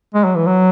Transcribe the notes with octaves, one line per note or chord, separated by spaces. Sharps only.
G#3
F#3
E3
F#3